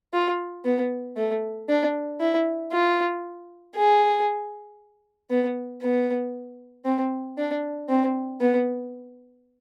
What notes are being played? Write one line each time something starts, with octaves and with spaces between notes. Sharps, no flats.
F4
B3
A3
D4
E4
F4
G#4
B3
B3
C4
D4
C4
B3